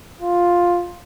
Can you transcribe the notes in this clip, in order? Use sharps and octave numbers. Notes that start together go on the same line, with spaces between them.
F4